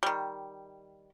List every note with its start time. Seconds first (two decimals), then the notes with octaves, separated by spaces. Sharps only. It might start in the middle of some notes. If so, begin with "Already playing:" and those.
0.03 D#3 G3